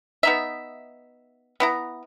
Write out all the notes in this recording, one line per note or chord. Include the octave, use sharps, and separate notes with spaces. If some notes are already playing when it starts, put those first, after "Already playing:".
B3 D#4 E5
B3 E4 A#5